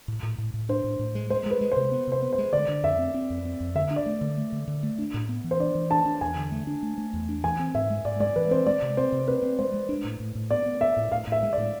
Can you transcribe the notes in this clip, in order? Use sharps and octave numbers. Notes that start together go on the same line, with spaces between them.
A2
A2
A2
A2
D4 C5
A2
A2
G#3
G#3 C5
G#3 B4
G#3
C5
C3
B3
C3 C5
B3
C5
G#3
D3 D5
D3
F2 E5
C4
C4
F2
C4
F2
D3 E5
D4
D5
A3
D3
A3
D3
D3
A3
D4
A2
B3
E3
C5
D4 D5
E3
D4 A5
D4
E2 G#5
D3
A3
D4
A3
A3
E2
D4
E3 G#5
C4
G#2 E5
G#3
G#2 D5
G#3 D5
E3 B4
C4 C5
G#3 D5
C3
C4 C5
C3
C4 B4
C4
G#3 C5
G#3
D4
A2
A2
A2
B3 D5
B3
B3 E5
A2
A2 F5
A2 E5
G#3
D5
A2